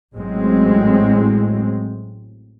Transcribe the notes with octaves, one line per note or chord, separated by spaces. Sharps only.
A1 A2 F#3 G#3 C4